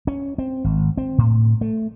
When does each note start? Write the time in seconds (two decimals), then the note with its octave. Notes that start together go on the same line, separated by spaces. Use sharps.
0.07 C#4
0.38 C4
0.64 G#1
0.97 C4
1.18 A2
1.61 A3